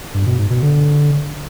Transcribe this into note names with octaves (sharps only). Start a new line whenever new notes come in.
G2
B2
G#2
B2
D3